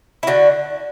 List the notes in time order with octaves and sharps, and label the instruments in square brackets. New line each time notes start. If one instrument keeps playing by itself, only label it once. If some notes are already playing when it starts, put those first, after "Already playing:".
[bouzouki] E4
D3 F#4